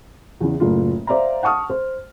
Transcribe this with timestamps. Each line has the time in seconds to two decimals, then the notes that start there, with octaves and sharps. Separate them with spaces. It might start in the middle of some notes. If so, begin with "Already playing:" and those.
0.41 E2 C#3 E3
0.60 F#1 A2 F4
1.07 C5 D5 E5 F5 A#5
1.43 F#5 A5 C#6 D#6 F6
1.70 C5